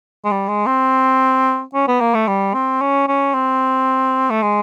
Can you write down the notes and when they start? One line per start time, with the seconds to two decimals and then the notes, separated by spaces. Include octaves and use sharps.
0.25 G#3
0.31 G3
0.48 G#3
0.66 C4
1.74 C#4
1.88 B3
2.00 A#3
2.14 A3
2.28 G3
2.54 C4
2.81 C#4
3.08 C#4
3.34 C4
4.30 A3
4.42 G#3